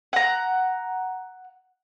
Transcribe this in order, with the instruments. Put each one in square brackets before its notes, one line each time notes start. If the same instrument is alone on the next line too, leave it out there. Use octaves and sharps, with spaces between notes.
[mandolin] F#5 A#5